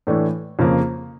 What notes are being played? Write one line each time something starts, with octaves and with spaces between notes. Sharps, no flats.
A2 E3 A3 D4
F2 C#3 F3 A#3